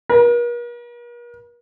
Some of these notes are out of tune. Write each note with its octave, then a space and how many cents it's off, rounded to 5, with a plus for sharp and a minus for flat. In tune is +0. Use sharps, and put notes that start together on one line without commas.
A#4 +45